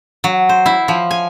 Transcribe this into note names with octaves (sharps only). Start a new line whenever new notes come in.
F#3
C5
E4
F3
G#5